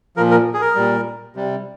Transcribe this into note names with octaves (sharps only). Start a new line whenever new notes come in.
A#2 F3 A#4
A#4
G#4
A#4
A#2 G3
C3 G3